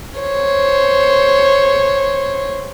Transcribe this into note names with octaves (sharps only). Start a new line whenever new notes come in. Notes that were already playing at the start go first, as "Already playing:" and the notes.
C5 C#5